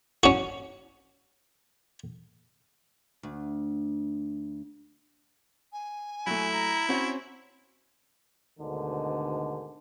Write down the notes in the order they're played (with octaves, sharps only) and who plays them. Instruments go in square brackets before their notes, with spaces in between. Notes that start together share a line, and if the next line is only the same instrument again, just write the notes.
[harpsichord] C#4 F#4
[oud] D2
[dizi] G#5
[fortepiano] F#3 A3 [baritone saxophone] E4
[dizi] A#5
[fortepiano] C4 C#4 F#4 [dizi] C#5
[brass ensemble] D2 G#2 B2 D3 D#3